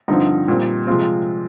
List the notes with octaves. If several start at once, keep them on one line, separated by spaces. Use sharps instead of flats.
G2 D3 F3 C4 D#4
A#2 G3 C4
C3 F3 G#3 C4 F4